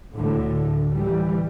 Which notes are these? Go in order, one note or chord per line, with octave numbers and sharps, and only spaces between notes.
D2 A2 D3
E3 G3